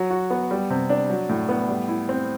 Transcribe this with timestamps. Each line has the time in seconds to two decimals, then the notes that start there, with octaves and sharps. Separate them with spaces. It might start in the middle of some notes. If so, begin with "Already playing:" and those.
Already playing: F#3
0.10 F#4
0.30 B3
0.51 G3
0.70 C3
0.89 D4
1.10 F#3
1.29 A2
1.49 B3
1.68 G3
1.88 E4
2.09 C4